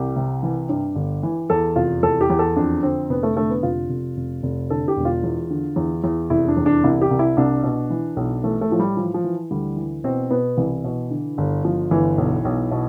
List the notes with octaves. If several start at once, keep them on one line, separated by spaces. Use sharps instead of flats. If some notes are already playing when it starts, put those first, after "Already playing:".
Already playing: C2 E3 G4
C3
E3
G2
G1
E3
E2 A4
F1 F4
E2 A4
G4
E2
A4
F2 D4
D3 C4
F1 B3
A3
D3 A3
B3
F1 F4
F1
F1
F1
D3 A4
G4
E1
F4
E2
D3
E2
E2
F1 E4
D4
E2
D4
C2 E4
G4
C2
E4
C2 D4
B2
E3
B1
E3 A3
A3
A2 F3
G3
E3 F3
F3
E3
D2 G3
E3
B2 C4
B2 B3
C2 E3
B2
D3
G1
G1 F3
G1 E3
B1
B1
B2